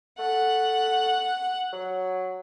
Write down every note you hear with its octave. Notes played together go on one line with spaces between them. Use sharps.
A3 F#5
F#3